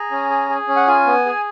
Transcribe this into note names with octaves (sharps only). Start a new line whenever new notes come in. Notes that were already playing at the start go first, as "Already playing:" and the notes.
Already playing: G#4 A#5
C#4
G#4
G#4
C#4
F#5
F4 G#5
B3
G#4